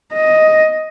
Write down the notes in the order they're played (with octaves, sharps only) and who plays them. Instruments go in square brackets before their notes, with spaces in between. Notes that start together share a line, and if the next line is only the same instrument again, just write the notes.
[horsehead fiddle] D#5